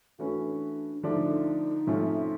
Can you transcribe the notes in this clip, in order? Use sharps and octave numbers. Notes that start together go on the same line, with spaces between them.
E3 A3 C#4 D4 F#4 B4
D3 F3 A3 D4 D#4
C3 F3 A3 C#4 F4